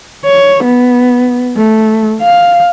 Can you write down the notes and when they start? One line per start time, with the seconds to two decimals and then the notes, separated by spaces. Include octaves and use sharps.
0.25 C#5
0.64 B3
1.57 A3
2.21 F5